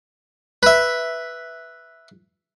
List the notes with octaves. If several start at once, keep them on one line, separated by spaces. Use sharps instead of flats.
B4 E5